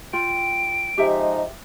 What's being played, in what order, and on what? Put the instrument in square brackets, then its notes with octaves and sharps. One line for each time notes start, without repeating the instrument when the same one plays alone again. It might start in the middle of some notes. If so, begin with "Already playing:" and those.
[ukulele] F4 G5 [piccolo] D7
[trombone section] F3 G#3 D#4 [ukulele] G4 E5